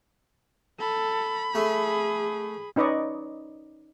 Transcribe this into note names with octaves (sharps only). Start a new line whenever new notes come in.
A4 B5
A3 G#4
C#4 D#4 B4 D5 D#5 C#6